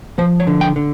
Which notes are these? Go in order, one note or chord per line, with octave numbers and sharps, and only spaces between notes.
F3 C5
C#5
D3
G5
D3